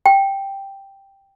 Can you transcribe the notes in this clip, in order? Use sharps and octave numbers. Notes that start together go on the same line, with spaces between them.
G5